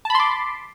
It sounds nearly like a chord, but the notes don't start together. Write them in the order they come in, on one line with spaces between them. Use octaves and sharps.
A5 B5 C6 D6